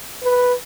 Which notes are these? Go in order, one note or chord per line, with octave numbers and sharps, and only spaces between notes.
B4